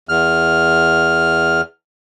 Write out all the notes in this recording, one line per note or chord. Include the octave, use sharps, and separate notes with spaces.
E2 F6